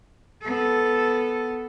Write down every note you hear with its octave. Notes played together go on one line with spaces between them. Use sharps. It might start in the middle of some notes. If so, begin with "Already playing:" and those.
B3 A4